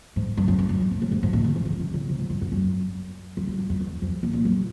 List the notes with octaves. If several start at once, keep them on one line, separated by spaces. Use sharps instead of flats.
G#2
G2
F#2
G2
F#2
G2
A2
A2
G#2
G#2
A#2
D#3
E3
D#3
D3
C#3
C3
G#2
G2
F#2
F#2
F#2
F#2
F#2
F2
E2
F2
A#2
A#2
F#2